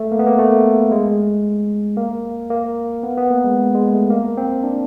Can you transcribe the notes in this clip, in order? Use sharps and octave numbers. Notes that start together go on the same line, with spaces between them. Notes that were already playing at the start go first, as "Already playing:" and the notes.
Already playing: A3
A#3
B3
A#3
A3
G#3
A#3
A#3
B3
B3
A#3
G#3
G#3
A3
A#3
C4
D4